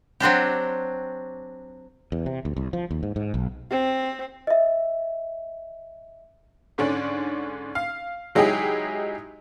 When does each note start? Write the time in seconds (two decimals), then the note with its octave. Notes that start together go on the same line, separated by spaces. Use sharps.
0.20 F#3 C4 D4 G4
2.12 E2
2.26 C3
2.45 D2
2.57 C2
2.73 F3
2.91 D#2
3.03 G#2
3.16 G#2
3.34 B1
3.70 C4
4.47 D#5 E5
6.78 G#2 D3 C#4 D4
7.75 F5
8.35 F#3 G#3 D#4 E4 G4 G#4